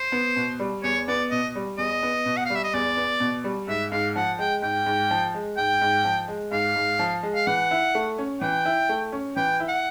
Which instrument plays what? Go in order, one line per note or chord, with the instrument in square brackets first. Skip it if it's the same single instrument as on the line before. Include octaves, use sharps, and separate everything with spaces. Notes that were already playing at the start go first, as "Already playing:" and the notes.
Already playing: [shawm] C5
[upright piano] B3
B2
G3
[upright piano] E2 [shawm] C#5
[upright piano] B3 [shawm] D5
[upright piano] B2 [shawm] D#5
[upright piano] G3
[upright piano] E2 [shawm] D#5
[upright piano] B3
B2
[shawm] F#5
F5
[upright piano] G3
[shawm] E5
D#5
[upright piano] E2 [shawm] D5
[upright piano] B3
B2
G3
[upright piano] G#2 [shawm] E5
[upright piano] G#2 [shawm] F5
[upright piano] F3 [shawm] F#5
[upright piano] G#3 [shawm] G5
[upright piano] G#2 [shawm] G5
[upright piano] G#2
F3
G#3
[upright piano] G#2 [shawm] G5
[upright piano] G#2
F3
G#3
[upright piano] G#2 [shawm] F5
[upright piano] G#2
F3
G#3
[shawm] F5
[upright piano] E3 [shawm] F#5
[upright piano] E4
A3
C#4
[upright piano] E3 [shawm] G5
[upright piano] E4
A3
C#4
[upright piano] E3 [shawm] G5
[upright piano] E4
[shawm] F#5